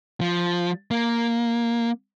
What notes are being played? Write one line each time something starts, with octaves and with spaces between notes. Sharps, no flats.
F3
A#3